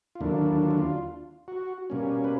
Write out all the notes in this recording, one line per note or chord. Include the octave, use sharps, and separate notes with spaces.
F4
D#2 D3 F#3 A#3 D4 E4
E4
F4
E4
F4
F#4
B2 G3 A#3 C#4
B4